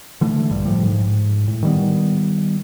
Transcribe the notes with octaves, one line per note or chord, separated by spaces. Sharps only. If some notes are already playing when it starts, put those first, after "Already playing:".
D3 E3 A3
A#1 G2 D3 G3
A2 F3 G3
G#2
A2
D#3 G3 B3